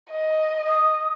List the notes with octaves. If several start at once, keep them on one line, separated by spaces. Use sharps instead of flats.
D#5
D#6